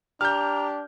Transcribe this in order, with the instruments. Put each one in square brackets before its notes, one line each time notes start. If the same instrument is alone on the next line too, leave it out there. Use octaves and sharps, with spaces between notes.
[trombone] D4 [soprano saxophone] G4 [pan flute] A#5 [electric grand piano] F6 G6